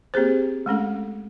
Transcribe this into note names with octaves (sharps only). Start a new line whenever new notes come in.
A#3 C4 G4 G#4 C5
G#3 A3 C#4 A4